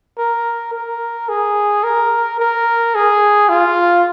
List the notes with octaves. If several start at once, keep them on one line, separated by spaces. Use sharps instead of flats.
A#4
A#4
G#4
A#4
A#4
G#4
F4